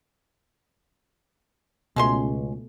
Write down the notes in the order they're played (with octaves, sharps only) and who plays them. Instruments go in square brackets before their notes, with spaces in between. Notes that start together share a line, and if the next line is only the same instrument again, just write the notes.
[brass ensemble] C#2 [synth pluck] B2 A3 [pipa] G#3 C#4 C6